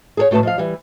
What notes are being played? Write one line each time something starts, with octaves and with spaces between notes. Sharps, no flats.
G#4 A4 C#5
A2 A3 F#4 A#4 B4 A5
F3 D#5 F5
E3 G3